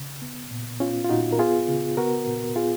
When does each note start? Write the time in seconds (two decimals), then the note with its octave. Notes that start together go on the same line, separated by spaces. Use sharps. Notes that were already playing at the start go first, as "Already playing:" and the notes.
Already playing: C#3
0.22 B3
0.51 A#2
0.80 B3 C#4 F4
1.04 F4
1.09 A#2 D#4 F#4
1.32 A#4
1.39 B3 F4 G#4
1.68 C#3
1.97 B3 F#4 A#4
2.27 A#2
2.56 B3 F4 G#4